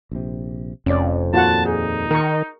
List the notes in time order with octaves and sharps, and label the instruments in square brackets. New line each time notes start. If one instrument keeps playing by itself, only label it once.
[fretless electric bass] A#1 C3
[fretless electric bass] F1 [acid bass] F2 [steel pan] C#4 D5
[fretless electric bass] D#2 A#2 [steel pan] F4 F#4 F#5 [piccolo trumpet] A5
[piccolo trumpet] D#4 [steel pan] G#4
[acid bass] D#3 [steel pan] A#4 C#6